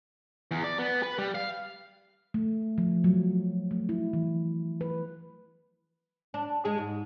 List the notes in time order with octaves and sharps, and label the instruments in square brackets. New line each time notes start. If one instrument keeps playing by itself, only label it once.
[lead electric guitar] E2
D5
B3
B4
G3
F5
[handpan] A3
F3
F#3
A3
E4
E3
B4
[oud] D4
G#3 G#4
G#2